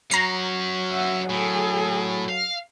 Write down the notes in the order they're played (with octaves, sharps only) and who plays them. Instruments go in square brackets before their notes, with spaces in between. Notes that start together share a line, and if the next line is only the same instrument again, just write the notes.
[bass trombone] F#3 [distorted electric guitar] C#4 F#4 [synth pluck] A#5 C7
[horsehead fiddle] E5 F#5
[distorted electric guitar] A2 [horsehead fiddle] G#4 A4
[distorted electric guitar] F5